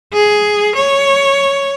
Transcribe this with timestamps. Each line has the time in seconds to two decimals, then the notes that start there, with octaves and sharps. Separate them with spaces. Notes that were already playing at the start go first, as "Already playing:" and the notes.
0.13 G#4
0.75 C#5